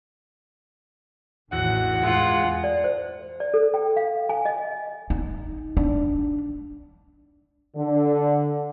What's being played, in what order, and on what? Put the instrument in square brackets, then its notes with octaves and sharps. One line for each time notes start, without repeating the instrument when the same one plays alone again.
[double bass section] A1 D#3 [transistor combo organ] E2 F#4 [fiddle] F#5
[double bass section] E2 G2 [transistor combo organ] G#3 [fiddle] F4 F#5
[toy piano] D5
C5
D5
A4
G5
F5
G#5
D#5
[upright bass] D#4
D4
[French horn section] D3